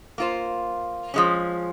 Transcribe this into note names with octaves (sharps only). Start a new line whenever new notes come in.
A#3 F4 C5
F3 G#3 C#4